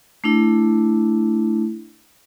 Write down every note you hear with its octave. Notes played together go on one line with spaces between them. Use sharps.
A3 D4 E4